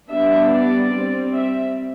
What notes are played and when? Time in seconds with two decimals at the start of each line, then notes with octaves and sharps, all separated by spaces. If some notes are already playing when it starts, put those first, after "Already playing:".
0.11 G3 B3 D4 E5
0.52 D5
0.93 G3 C4
1.34 E5